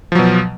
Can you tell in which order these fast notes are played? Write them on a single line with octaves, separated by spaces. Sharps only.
F3 F#3 B2